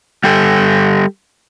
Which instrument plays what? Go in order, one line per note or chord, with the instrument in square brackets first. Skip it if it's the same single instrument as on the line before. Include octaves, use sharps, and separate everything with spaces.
[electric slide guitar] G3 G4 A4